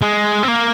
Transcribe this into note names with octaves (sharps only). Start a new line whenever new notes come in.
G#3
C4
A#3